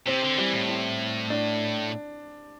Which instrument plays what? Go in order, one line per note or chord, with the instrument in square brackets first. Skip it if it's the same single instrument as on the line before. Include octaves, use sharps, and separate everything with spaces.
[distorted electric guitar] C3 [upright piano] C4
[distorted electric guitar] D3
[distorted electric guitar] E3 [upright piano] G3
[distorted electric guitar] A2
[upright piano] C4
D4